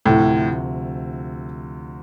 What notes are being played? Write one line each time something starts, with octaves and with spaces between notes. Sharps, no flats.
D2 A2 C3 F3